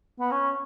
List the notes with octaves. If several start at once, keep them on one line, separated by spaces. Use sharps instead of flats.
B3
C#4